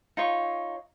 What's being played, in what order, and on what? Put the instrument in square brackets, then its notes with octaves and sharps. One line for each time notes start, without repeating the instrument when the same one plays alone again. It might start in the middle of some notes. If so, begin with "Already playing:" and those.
[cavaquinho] D#4 F4 C#5